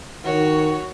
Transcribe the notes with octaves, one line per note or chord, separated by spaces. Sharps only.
D#3 F#4 C#5